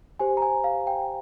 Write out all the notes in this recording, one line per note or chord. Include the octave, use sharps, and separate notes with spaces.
G4 C5 G#5
A#5
G#5
F5
G5